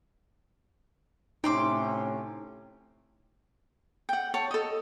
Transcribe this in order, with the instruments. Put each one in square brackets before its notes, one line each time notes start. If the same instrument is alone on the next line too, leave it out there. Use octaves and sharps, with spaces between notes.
[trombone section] A2 C3 C#4 [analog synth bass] D#4 [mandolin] G5 C6 D6
[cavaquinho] F#5 G5
C#5 A5
A4 D#5